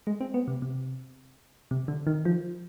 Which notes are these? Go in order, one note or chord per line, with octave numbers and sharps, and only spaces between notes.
G#3
C4
B3
C3
C3
C3
D3
D#3
F3